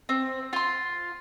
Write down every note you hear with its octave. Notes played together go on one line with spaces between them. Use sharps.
C4
F4 C6